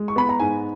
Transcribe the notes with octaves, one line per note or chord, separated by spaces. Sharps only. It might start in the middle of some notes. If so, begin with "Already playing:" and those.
Already playing: G#3
C#6
B3 B5
A#5
G#2 G#5